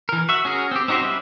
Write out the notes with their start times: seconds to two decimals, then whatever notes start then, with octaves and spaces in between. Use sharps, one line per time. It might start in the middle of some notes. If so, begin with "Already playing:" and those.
0.09 E3 A#4
0.29 F#4 E5
0.45 C#4 F#4 G#4 A#4
0.71 C4 G4
0.88 C4 D#4 F#4 G4 C5
1.01 G3 C#4 E4 B4 E5